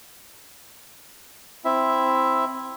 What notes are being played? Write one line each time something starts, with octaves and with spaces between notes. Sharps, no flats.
C4 E4 E5